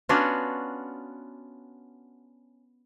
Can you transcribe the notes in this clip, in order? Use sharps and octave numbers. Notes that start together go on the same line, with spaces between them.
B3 C#4 D4 F4 F#4